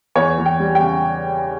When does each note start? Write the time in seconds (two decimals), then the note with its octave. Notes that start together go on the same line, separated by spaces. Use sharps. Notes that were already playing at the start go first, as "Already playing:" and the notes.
0.15 E2 C#5
0.38 E2
0.46 G5
0.60 G3
0.75 G5
0.82 C#3